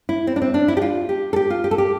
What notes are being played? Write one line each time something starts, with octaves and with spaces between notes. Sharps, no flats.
E4
C4
D4
C4
D4
E4
G4
F4
G4
A4
G4
F4
G4
A4
G4